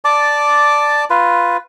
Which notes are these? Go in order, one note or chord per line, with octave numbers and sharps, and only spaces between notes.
D5 A5 D6
F4 B4